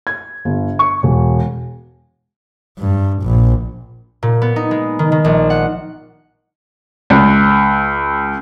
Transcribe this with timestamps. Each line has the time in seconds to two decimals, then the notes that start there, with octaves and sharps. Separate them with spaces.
0.07 G#6
0.45 G1
0.79 C#6
1.03 E1
2.79 G2
3.23 A#1
4.23 A#2
4.42 B3
4.56 D#4
4.71 G#3
4.99 D#3
5.12 D#3
5.24 A#1
5.50 F#5
7.10 C#2